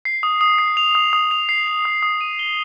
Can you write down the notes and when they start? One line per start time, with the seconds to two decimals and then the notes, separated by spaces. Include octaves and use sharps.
0.05 C7
0.23 D#6
0.41 D#6
0.59 C7
0.77 F7
0.95 D#6
1.13 D#6
1.31 F7
1.49 C7
1.67 F7
1.85 D#6
2.02 D#6
2.21 D#7
2.39 G7